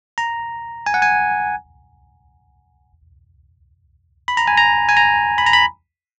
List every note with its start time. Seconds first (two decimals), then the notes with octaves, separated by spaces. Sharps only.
0.18 A#5
0.86 G#5
0.94 F#5
1.02 G#5
4.28 B5
4.37 A#5
4.48 G#5
4.57 A#5
4.89 G#5
4.97 A#5
5.38 B5
5.46 A#5
5.53 B5